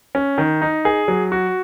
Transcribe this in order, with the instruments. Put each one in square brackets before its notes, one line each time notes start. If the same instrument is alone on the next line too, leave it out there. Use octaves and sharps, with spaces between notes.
[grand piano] C#4
D#3
D#4
G#4
F#3
F#4